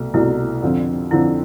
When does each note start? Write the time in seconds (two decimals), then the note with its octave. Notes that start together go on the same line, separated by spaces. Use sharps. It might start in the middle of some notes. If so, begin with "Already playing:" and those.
Already playing: C2 B2 A3
0.14 C2 B2 A3 E4
0.62 F2 D3 F3 C4
1.11 F2 D3 F3 C4 E4